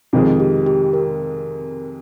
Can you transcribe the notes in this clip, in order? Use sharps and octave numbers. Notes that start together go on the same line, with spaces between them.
F2 C3 D#3 G#3 F4
G4
G4
A#4